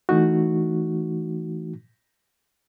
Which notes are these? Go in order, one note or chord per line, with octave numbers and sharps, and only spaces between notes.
E3 A3 D#4 F#4